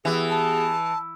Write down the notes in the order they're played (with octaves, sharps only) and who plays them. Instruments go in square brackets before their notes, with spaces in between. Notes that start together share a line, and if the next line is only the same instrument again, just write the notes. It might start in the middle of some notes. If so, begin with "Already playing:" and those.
[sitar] E3 [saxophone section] B3 G4 G#4
[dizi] A5